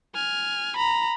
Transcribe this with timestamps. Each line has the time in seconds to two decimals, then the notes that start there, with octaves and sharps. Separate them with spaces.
0.15 G#5 F6
0.76 A#5 B5